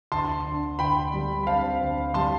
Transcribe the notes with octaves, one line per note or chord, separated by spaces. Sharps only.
D2 A5 C6
D3
D2 G5 B5
G3
B5
C4 F5 A5
D2
G3 A5 C6